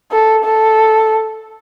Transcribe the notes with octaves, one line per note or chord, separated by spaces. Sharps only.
A4
A4